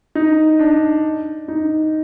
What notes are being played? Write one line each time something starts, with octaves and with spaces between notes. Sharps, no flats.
D#4
D4
D#4